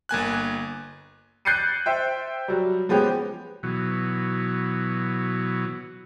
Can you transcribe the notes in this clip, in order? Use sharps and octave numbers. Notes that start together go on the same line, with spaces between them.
G1 A#3 G#5 F#6
F#6 G6 A6 C7 C#7 D#7
C5 E5 G5
F#3 G3
F3 G#3 B3 C#4 G4
B2 E3 F#3